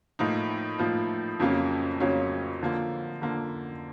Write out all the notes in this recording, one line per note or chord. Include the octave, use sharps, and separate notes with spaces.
A2 F3 A#3 D#4
A2 F3 A#3 D#4
F2 C#3 F#3 A#3 C#4
F2 C#3 F#3 A#3 C#4
D3 F3 A#3
D3 F3 A#3